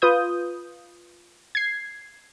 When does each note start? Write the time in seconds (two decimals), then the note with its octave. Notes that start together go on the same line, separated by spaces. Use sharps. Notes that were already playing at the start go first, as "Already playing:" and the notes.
0.02 F4 B4 D#6 G6
1.55 G#6 C7